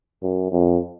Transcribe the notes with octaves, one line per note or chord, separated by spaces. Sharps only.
F#2
F2